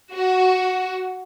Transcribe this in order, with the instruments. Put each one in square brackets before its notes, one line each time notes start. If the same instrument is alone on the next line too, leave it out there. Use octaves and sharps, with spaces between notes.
[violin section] F#4